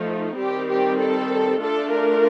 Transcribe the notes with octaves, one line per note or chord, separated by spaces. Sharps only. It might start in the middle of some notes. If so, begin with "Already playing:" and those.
Already playing: F3 A3 D#4
D#3 G3 C4 G4
G4
A4
A3 D4 F4 A4
A#4